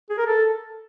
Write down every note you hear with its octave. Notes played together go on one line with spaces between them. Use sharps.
G#4
A#4
A4